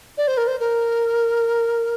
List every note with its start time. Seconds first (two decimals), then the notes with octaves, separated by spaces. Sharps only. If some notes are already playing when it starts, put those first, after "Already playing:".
0.18 D5
0.28 C5
0.37 A#4
0.48 C5
0.60 A#4